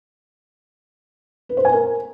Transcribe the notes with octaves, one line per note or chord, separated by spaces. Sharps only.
B4
C5
G#5
A#4